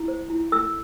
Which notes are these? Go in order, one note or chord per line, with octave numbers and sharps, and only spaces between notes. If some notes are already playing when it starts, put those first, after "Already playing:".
Already playing: E4
C5
E4
A4 E6